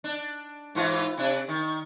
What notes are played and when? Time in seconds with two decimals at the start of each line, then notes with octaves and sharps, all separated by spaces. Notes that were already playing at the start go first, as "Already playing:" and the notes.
0.04 D4
0.75 G#2 E3 F4
1.17 C3 D4
1.48 D#3